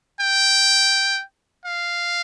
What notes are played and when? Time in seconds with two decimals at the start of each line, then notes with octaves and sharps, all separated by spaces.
0.20 G5
1.66 F5